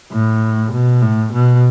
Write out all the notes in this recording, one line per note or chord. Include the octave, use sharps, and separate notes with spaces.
A2
B2
A2
B2